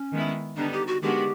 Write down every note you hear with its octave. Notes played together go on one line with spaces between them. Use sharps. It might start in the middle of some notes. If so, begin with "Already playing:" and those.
Already playing: C#4
D#3 G#3 B3 E4
D3 G3 B3 D4 D#4
G4
F#4
D#3 G#3 B3 D4 F#4 G4